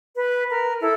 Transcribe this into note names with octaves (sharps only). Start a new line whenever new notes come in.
B4
A#4
E4 A4